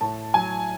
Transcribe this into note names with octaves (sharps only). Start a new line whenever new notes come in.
A2 A5
F#3 G#5